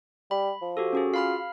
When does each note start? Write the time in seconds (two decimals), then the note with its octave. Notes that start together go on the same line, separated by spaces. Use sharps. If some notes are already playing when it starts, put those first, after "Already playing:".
0.31 G3 B5
0.62 F3
0.77 F#4 G4 A4
0.93 C#4 F#4 G#4
1.14 F4 F5 B5 F6